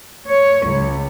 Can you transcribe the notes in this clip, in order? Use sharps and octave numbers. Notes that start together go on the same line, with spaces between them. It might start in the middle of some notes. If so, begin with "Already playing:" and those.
C#5
C#2